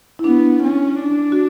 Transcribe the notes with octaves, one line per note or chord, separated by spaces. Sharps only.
E4
B3 D4
C#4
D4
F#4